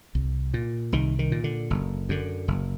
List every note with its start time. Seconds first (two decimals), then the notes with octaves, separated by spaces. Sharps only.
0.15 C2
0.54 A#2
0.92 C2 D#3
1.19 D#3
1.32 A#2
1.44 D3
1.70 F#1
2.09 F#2 D3
2.48 F#1